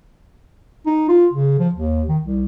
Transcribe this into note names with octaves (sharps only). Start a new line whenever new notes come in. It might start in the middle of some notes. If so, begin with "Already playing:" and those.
D#4
F4
C#3
F3
D#2
D#3
C2